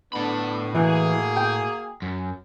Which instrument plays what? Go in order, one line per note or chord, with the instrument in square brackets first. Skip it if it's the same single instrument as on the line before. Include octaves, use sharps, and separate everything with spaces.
[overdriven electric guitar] A2 B5 [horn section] D3 B3 D4
[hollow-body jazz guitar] E3 [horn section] A#3 F#4 G#4
[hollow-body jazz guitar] G5
[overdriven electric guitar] F#2